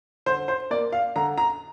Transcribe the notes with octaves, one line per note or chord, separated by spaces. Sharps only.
D3 C5
C5
A#3 D5
F5
D3 A#5
A#5